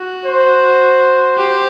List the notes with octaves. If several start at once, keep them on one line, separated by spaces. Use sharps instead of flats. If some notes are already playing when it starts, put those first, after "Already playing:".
Already playing: F#4
C5
G4